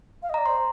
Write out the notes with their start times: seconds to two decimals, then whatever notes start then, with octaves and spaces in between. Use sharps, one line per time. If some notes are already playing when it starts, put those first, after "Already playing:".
0.23 F5
0.30 D#5
0.34 D5 A#5
0.46 C5 C6